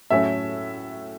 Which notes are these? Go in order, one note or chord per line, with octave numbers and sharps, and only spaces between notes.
A2 F#3 A3 C#4 E5